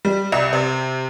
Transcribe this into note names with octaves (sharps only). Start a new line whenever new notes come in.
G3
C2
C3